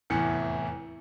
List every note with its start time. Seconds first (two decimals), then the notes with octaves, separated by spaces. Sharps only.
0.10 F1 E2 A2 E3 C#7